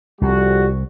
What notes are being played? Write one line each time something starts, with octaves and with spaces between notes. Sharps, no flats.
C2 F2 G3 F#4